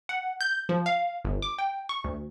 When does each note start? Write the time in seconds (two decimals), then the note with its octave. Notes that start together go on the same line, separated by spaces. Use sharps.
0.09 F#5
0.41 G6
0.69 F3
0.86 F5
1.25 G1
1.42 D6
1.58 G5
1.89 C#6
2.04 D2